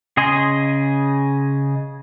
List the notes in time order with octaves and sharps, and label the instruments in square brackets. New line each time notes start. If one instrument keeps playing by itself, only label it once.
[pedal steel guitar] C#3 G#4 D#5 G#5 C6